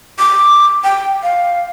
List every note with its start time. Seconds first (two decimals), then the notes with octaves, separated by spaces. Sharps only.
0.19 D6
0.84 G5
1.23 F5